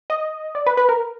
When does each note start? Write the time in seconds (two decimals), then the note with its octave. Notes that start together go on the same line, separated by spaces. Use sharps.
0.10 D#5
0.55 D5
0.66 B4
0.77 B4
0.89 A#4